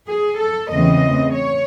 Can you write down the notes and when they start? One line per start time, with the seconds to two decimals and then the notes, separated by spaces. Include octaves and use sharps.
0.08 G#4
0.40 A4
0.72 E2 C#3 E3 A3 C4 D#5
1.34 C#5